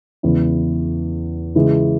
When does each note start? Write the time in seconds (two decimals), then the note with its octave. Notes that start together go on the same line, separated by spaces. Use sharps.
0.23 E2 C#3 G#3 B3 E4
1.55 C#3 E3 G#3